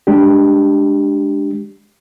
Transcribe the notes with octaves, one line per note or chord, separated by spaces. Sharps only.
G#3 D4 G4